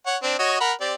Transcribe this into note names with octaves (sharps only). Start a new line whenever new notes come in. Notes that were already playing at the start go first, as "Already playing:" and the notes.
C#5 F#5
C4 D4
F#4 C#5 D#5
A#4 F#5 B5
C4 G4 D5